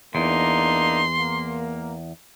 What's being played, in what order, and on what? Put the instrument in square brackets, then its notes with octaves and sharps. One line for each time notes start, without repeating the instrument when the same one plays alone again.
[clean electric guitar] E2 [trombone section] A#3 D4 D#4 [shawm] C6
[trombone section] A#3